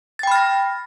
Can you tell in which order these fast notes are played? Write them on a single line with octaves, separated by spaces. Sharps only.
A6 G5 B5 F6 A#6